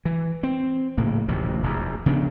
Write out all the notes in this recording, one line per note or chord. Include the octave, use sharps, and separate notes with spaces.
E3
C4
A#1 A2 C#3 A#3
D#1 A1 C3 F3
E1 A#1 E2
C#3 F3 B3 D4